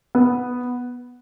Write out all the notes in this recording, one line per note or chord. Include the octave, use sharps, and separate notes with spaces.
B3